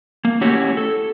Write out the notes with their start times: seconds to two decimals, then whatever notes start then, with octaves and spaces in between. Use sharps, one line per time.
0.25 A#3
0.41 A3 C#4 E4 F#4 G4 C#5
0.77 A4